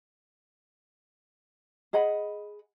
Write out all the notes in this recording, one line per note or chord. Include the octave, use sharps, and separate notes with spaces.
G#4 D#5 F#5 B5